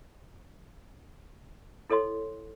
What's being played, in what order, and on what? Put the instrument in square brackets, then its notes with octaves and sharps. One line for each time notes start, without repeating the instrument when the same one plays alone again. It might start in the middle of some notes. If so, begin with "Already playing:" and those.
[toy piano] E4 A4 C#5 D#5 C6